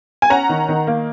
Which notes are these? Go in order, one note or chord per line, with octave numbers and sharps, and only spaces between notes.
G#5
C#4 F#5 A#5
D#3
D#3
A#3